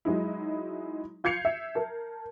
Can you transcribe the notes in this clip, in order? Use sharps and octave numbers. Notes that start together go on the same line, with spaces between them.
F#3 G#3 D#4 E4
F4 G6 G#6 C7 C#7 F7
E5
A#4 A5